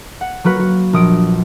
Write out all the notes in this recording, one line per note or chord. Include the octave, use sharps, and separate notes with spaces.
F#5
F#3 A#3 F#4 B4
F#4
A#1 D#6 D7